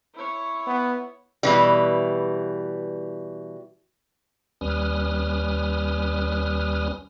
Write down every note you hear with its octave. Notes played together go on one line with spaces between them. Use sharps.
E4 C#5
B3
B2 E3 G3
D#2 G3 C#4 B4 D#6 F6